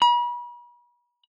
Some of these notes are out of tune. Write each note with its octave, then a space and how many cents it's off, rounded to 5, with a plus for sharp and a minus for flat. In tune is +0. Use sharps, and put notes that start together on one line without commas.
B5 -40